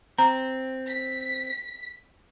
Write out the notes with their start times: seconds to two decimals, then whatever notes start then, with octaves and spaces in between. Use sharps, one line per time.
0.18 C4 A#5
0.89 B6